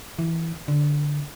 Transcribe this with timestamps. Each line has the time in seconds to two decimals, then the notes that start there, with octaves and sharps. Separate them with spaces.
0.19 E3
0.68 D3